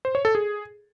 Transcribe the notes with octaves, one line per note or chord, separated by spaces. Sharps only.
C5
C#5
A4
G#4